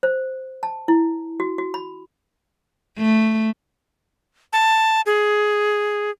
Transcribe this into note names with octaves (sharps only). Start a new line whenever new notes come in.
C5
A5
E4
F#4
F#4
B5
A3
A5
G#4